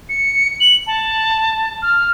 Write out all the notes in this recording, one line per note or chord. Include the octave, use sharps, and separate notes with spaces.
C#7
F#7
A5
F6